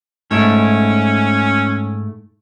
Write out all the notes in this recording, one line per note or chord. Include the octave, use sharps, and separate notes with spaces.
G#2 A3 C#4 E4